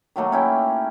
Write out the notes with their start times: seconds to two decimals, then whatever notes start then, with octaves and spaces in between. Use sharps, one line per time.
0.16 D#3 F#3 A3 A#3
0.32 C#4 E4 G5